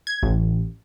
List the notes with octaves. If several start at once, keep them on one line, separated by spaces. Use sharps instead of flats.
G#6
A1